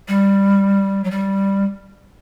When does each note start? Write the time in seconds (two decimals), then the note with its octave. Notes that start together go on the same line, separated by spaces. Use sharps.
0.08 G3
1.04 F#3
1.11 G3